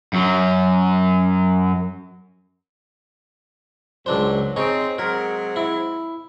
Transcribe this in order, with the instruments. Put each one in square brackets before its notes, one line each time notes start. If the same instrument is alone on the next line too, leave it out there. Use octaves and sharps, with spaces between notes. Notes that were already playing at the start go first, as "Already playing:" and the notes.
[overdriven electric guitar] F#2 F#3
[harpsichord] C#2 D4 C5 [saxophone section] F#2 F#3
[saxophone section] C4 [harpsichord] D#4 G#4 C#5
[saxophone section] F#3 G#3 C4 [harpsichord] A#4
[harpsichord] E4